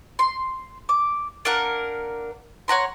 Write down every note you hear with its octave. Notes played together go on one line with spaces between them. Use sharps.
C6
D6
A#3 D4 A#4 F#5
C#5 F#5 A#5 C6